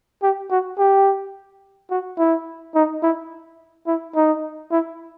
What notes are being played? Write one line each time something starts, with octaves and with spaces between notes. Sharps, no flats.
G4
F#4
G4
F#4
E4
D#4
E4
E4
D#4
E4